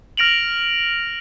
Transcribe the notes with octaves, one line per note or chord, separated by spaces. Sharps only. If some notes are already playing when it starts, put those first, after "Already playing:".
F6 A#6 D7 F7 F#7